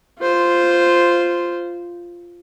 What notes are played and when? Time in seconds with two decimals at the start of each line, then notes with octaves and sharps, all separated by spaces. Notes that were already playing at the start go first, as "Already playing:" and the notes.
0.20 F4 C5